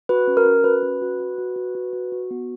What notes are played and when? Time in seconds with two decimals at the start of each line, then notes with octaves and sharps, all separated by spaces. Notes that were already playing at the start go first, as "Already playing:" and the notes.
0.09 F#4 B4
0.27 C#4
0.37 A#4
0.46 C#4
0.64 F#4 B4
0.83 C#4
1.02 F#4
1.20 F#4
1.38 F#4
1.56 F#4
1.75 F#4
1.93 F#4
2.12 F#4
2.31 B3